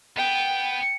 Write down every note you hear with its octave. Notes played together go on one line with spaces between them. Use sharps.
B3 G5